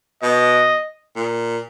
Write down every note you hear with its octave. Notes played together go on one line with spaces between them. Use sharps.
B2 D#5
A#2